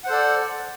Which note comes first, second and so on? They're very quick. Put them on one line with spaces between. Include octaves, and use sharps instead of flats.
F#5 C5 A4 D5